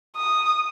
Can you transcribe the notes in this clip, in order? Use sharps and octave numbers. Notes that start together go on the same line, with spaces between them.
D#6